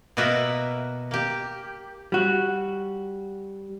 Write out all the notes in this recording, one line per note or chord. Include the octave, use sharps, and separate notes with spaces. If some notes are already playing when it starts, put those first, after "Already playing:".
B2 A#3 B3 F#4 A#4 E5
A#3 G4
G3 F#4